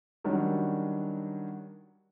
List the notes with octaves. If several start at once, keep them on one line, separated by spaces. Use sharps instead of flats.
D#3 F#3 G3 C#4 D4